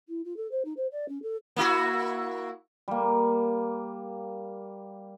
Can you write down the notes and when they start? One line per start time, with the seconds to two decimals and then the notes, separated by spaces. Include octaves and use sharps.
0.08 E4
0.24 F4
0.37 A4
0.51 C5
0.64 D#4
0.77 C5
0.91 D5
1.08 C#4
1.22 A4
1.56 A#3 E4 F#4
2.88 G3 A#3